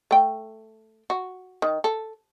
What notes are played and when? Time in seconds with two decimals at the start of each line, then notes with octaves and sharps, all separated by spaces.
0.11 A3 G5
1.10 F#4
1.62 D#3
1.84 A4